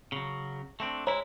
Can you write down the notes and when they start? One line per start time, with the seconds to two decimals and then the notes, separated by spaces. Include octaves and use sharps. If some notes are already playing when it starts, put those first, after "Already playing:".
0.12 C#3 F#3
0.80 A3 C4 D4
1.07 G#3 E4 C#5 A#5